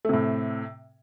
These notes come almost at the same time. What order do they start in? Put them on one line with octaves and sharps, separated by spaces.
A3 C3 A2